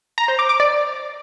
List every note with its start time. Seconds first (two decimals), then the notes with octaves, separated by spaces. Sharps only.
0.18 A#5
0.28 C5
0.39 D6
0.49 D6
0.60 D5